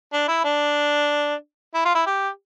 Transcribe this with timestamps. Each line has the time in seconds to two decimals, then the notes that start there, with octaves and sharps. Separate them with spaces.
0.13 D4
0.28 E4
0.44 D4
1.74 E4
1.85 F4
1.95 E4
2.06 G4